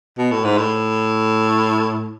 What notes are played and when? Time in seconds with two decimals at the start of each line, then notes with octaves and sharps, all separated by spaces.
0.18 B2
0.31 A2
0.44 G#2
0.58 A2